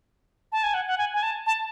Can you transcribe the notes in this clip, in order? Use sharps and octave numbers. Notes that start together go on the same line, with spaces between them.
A5
G#5
F#5
F#5
G#5
G#5
A5
A5